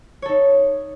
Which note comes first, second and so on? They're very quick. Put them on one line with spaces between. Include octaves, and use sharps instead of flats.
C#5 A4 D#4